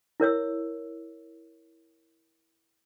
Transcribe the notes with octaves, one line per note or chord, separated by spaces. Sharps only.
E4 A#4 C#5 E6